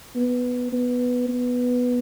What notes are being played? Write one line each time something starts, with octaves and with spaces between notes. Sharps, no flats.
B3
B3
B3